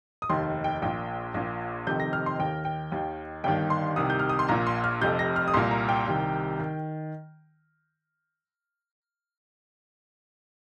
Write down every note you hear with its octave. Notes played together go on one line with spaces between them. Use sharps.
D#6
F1 D#2 D#3 C6
G5
A#1 A#2 G5
A#1 A#2
F1 F2 C3 D#3 G6
A#6
F6
C6
D#2 D#3 G5
G5
D#2 D#3
G1 G2 D#3 G5
C6
C2 C3 D#3 D#6
G6
F6
D#6
C6
A#1 A#2 A#5
C6
F6
F1 F2 C3 G6
A#6
F6
D#6
C2 A#2 C6
A#5
G5
C2 C3 D#3
D#3